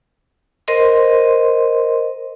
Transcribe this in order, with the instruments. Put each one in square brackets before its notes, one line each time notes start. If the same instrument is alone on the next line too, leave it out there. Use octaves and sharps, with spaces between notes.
[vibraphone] A#4 C5 D#5 C6